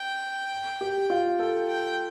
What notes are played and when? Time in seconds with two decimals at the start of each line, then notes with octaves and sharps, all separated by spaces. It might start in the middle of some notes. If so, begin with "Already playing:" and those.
Already playing: G5
0.81 G4
1.10 F4
1.39 A4 G5
1.69 G5